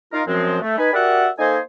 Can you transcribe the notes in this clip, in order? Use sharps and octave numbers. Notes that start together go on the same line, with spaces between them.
D#4 F4 A#4 F5
F#2 F3 G#3 C4
A3
D#4 B4 G#5 B5
F#4 G4 A#4 D5 E5 F#5
A#3 D#4 A4 C5 D#5 G#5